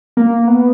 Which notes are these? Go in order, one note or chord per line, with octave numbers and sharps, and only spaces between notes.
A#3
B3